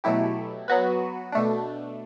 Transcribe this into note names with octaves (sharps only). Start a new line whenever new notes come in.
B2 F#3 A3 E4 G4
F#3 B3 F#4 B4
B2 A3 D4